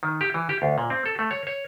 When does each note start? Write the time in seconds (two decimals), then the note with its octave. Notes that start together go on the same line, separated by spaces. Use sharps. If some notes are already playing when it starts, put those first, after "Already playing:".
0.03 D#3
0.21 G4
0.34 E3
0.49 G4
0.62 D2
0.78 A#2
0.90 C4
1.06 A4
1.19 A3
1.31 C#5
1.47 C#5